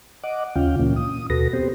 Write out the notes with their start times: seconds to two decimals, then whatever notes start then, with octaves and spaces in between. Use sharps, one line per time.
0.24 D#5 F#5 D6
0.56 D#2 C#3 C#4 F4 F5 G5
0.79 D2 A#2 E3 A#3 C#4
0.96 D#6
1.30 D#2 B2 F#4 A4 B4 A#6
1.53 B3 C4 G4 C5